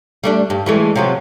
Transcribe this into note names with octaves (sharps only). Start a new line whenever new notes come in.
G3 A3 D4
G2
E3 G#3 A3
C3 F3 F#3